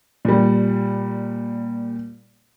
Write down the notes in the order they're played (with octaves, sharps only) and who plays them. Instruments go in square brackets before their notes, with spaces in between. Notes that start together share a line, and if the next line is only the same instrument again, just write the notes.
[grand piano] A#2 G3